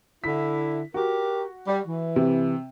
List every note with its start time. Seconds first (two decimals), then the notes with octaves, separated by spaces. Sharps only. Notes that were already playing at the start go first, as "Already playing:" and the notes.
0.24 D3 E4 B6
0.94 F#4 G4 A#4
1.67 G3
1.87 E3
2.16 C3